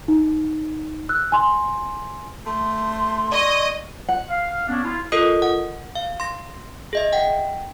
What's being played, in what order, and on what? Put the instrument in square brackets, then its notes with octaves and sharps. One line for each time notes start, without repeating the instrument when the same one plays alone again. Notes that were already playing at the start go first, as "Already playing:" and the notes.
[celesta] D#4
E6 F#6
G#5 C6
[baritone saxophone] A3 [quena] C6
[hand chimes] D5 C#6 [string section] D#5
[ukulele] F#5
[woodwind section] F5
B3 C#4 D4
E4 F4
[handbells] F4 A4 A#4 D#5 D#6
F#5
F5
C6 A#6
G#4 D#5 E5
F#5 G5